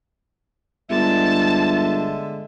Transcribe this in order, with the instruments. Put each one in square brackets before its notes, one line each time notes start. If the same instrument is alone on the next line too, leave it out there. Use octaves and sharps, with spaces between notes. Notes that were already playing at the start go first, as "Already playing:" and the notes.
[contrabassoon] G1 [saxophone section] D3 G#3 E5 [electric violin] A5